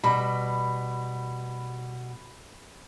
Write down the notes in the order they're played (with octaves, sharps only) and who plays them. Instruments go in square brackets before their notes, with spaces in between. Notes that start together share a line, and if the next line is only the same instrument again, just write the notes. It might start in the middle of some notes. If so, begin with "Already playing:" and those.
[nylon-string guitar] B2 G3 [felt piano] B5